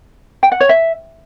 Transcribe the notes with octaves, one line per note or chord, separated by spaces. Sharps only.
G5
F#5
C#5
E5